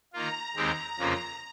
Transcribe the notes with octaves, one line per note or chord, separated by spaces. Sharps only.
D#3 A#3 F4 A#5
D#2 D#3 G#3 C4 G4
F2 C#3 F3 A#3